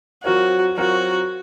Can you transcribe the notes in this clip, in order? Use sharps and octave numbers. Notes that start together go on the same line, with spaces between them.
F#3 C4 F4 F#4 A#4 C#5
F#3 C4 F4 F#4 A#4 C#5